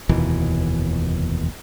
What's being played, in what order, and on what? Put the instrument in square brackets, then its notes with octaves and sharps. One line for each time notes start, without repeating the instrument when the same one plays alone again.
[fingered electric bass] F1 D#2 B2 E3